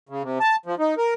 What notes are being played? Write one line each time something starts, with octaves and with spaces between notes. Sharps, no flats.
C#3
C3
A5
F3
D#4
A#4